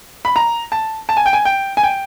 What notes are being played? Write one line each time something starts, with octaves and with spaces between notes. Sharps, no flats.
B5
A#5
A5
A5
G#5
G5
G#5
G5
G#5
G5